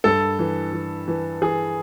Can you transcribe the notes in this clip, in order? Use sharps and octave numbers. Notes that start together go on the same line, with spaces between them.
G2 A4
E3
E3
E3
E3 G#4